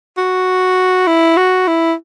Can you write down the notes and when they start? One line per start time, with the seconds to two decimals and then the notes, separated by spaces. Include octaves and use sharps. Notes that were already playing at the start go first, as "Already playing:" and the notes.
0.18 F#4
1.07 E4
1.37 F#4
1.68 E4